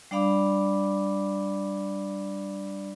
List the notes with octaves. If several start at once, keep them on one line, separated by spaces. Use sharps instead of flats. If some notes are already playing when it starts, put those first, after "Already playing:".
G3 D4 D5 F5 B5 D6